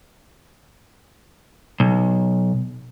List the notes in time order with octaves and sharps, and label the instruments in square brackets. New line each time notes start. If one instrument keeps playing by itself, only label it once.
[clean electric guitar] B1